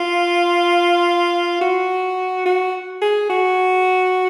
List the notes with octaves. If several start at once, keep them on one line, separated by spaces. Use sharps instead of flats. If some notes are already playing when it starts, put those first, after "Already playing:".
Already playing: F4
F#4
F#4
G#4
F#4